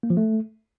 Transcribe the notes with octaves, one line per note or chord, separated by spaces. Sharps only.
A#3
F3
A3